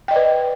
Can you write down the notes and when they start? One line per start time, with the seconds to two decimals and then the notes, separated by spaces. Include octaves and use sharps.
0.08 G5
0.11 D#5
0.13 D5
0.16 B4